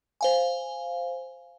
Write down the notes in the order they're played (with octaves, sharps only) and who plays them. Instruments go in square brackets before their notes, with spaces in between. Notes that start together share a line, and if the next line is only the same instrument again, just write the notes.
[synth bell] C5 F5 G#5